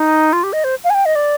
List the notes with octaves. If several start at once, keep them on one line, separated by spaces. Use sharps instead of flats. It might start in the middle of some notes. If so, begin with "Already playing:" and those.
Already playing: D#4
F4
G4
D#5
C5
F5
G#5
G5
D#5
D5